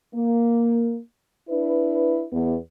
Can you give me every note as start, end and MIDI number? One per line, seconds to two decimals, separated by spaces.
0.15 0.99 58
1.50 2.25 62
1.50 2.25 64
1.50 2.25 71
2.32 2.58 40
2.32 2.58 59